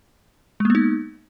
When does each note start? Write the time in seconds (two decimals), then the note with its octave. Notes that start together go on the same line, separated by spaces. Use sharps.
0.60 G#3
0.65 A#3
0.70 B3
0.75 D#4